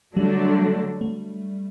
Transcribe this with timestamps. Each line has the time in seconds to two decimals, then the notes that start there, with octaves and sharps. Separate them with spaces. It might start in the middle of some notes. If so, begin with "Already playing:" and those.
0.16 D3 F#3 G3 A3 D4
1.01 A3